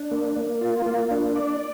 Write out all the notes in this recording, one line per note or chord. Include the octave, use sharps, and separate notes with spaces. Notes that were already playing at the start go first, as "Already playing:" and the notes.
Already playing: D4
A#3
A#3
F4
A#3
D4
D5